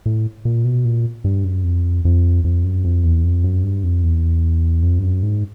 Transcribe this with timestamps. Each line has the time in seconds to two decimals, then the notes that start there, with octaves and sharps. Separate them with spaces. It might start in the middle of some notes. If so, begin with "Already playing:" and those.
0.06 A2
0.45 A#2
0.65 B2
0.85 A#2
1.24 G2
1.45 F#2
1.64 F2
2.05 F2
2.44 F2
2.64 F#2
2.84 F2
3.04 E2
3.23 F2
3.44 F#2
3.63 G2
3.84 F2
4.03 E2
4.83 F2
4.99 G2
5.03 F#2
5.23 G#2